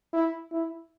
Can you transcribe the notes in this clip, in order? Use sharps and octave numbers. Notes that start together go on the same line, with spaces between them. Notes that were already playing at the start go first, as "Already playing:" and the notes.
E4
E4